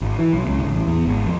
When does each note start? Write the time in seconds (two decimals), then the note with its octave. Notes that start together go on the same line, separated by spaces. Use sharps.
0.01 G#1
0.19 E3
0.33 B1
0.46 C#2
0.59 G1
0.71 A1
0.87 E2
1.06 G#1
1.26 F2